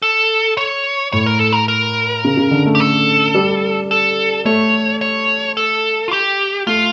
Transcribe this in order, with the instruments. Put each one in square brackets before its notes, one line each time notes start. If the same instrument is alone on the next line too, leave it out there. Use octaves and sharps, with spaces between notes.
[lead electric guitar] A4
C#5
[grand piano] A2 [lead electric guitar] C#5
[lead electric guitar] A#4
A4
A#4
A#4
[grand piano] C#3
C#3
D3
A3
[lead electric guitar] G4
A4
[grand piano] G3
[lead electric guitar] A4
[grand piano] A3 [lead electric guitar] C#5
[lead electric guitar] C#5
A4
F4
G4
[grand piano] A3 [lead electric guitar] F4